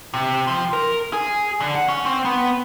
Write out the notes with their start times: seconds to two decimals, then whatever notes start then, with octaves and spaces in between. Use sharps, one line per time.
0.14 C3
0.47 F3
0.73 A#4
1.13 G#4
1.60 D3
1.75 F#5
1.88 C#4
2.05 C4
2.25 B3